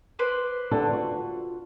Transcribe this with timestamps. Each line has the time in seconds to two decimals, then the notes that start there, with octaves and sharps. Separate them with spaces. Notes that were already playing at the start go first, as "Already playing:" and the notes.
0.19 B4 C5 D5
0.71 D3 G3 A4
0.91 F4 F#4